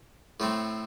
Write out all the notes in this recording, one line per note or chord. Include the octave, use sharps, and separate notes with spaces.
A2 A3 C4